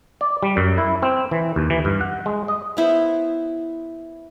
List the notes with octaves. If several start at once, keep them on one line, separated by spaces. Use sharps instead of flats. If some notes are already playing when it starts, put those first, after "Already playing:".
D5
G3
F#2
E4
C4
E3
D#2
E3
G2
F#5
G#3
D#5
B3 E4 C5